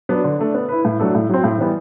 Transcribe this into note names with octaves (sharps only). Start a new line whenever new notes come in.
F#3 B3 D4
D3
A3 D4
B3
E4 B4
A2
F#3 A3 D4 A4
A2
F#3 C4
A2
E3 G3 B3